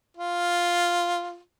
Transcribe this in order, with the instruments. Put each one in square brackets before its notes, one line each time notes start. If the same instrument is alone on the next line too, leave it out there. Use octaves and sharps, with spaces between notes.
[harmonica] F4